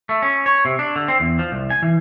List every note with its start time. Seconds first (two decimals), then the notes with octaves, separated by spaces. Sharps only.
0.09 A3
0.22 C#4
0.46 C#5
0.65 C3
0.79 D4
0.96 D3
1.08 C4
1.20 E2
1.39 F3
1.52 C2
1.70 G#5
1.83 E3